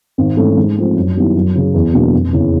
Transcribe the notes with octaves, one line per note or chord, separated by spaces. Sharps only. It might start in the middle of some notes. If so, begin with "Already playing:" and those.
G#1
G#2 E3 A3 C#4
G#2
F3 A3 C4
F#2
D#3 G3 B3 E4
F#2
C#3 F#3
E2
B2 F#3 A#3 D4
F1
E2 C#3 E3